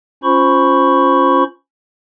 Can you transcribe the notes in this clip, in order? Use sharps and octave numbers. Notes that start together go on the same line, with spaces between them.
C#4 F4 C5 B5 C#6